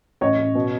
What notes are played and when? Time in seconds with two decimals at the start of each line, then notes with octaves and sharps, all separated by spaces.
0.21 A1 C#5 D#5
0.39 A1
0.55 B2